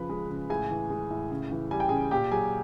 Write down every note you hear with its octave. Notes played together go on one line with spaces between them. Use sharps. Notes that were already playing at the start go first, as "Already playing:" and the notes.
Already playing: C#3 F3 B4 B5
G#3
C#3
A2 G#4 G#5
E3
G#3
A2
C#3
E3
G3 G#5
G5
C#3 G#4 G#5
A#2 G4 G5
F#3 G#4 G#5